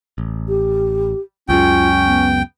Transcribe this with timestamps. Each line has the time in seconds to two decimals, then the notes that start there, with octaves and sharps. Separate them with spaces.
0.18 A1
0.49 G4
1.49 C#2 F#2 C#3 C#4 F4 G5
2.06 B3